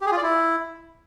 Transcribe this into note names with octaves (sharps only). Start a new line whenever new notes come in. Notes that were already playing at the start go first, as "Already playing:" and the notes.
G4
G#4
F4
D5
E4